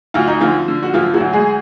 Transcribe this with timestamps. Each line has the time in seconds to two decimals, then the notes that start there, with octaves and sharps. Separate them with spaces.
0.14 D2 F4
0.27 D#4
0.41 D3 F3 F4
0.68 D3
0.83 F#4
0.94 D2 F3 F4
1.14 F#3 F#4
1.20 D2
1.33 G#3 G#4